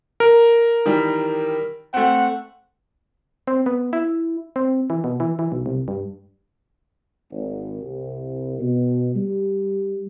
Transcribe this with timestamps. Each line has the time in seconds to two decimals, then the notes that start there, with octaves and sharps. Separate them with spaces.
0.20 A#4
0.86 D#3 E3 G3
1.94 A3 C4 F#5
3.47 C4
3.66 B3
3.93 E4
4.56 C4
4.90 E3
5.04 B2
5.20 E3
5.39 E3
5.52 B1
5.66 C2
5.88 G2
7.32 G#1
7.82 C2
8.60 B2
9.15 G3